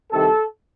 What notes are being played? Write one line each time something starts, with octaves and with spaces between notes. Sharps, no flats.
C2 C3 D#3 A4